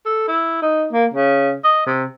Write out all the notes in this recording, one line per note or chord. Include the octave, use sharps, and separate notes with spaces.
A4
E4
D#4
A#3
C#3
D#5
C3